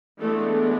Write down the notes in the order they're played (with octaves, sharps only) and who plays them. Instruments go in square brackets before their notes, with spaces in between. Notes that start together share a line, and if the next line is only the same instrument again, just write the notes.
[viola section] E3 G#3 A3 B3 D4 A4